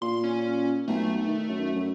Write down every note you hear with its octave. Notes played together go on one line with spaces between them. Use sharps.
A#2 C6
C#4
B1 A3
D#3
F#2
F#2